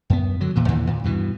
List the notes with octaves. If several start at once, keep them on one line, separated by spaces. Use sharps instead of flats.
F#2 B3
D3 F#3
D#1 A#2 E3
D#2 A#2 D3 E3
D#2 A#2
G2 B2 E3